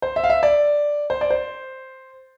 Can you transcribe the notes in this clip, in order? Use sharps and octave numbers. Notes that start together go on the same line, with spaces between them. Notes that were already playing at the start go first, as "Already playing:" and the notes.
C5
E5
F5
E5
D5
C5
D5
C5